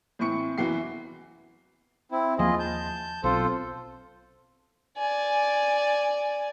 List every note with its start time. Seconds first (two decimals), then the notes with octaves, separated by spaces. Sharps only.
0.19 A2 E3 C4 C#6 C#7
0.58 F#1 E2 E3 F#4 C7
2.12 C4 E4
2.38 D#2 F3 A#3 F4 G#4 D#5
2.59 A5 G6
3.24 B1 C4 F4 A4 C5
4.98 D5 G#5